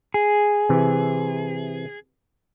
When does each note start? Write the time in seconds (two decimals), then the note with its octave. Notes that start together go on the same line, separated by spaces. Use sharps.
0.14 G#4
0.69 C3 E3